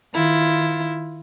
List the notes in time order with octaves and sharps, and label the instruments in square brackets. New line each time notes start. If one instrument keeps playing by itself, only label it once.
[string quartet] D#3 E4 F4